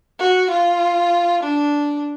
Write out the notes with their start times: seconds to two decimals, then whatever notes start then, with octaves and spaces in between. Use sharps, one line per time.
0.19 F#4
0.51 F4
1.43 D4